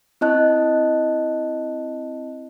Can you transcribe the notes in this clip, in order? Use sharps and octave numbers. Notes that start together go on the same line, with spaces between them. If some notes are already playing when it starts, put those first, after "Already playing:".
C4 E4 D#5 A5 F#6